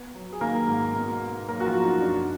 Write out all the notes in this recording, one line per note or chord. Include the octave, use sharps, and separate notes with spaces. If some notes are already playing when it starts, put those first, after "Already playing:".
Already playing: B3
F#3
G#4
D#3 A#3 A#4
G#2
B2
B3
F#3 A#3 A#4
F#4
F3 F4
B2
D#4
F#2 D4